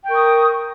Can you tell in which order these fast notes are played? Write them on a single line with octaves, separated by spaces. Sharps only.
G5 A#4 C#6 D#6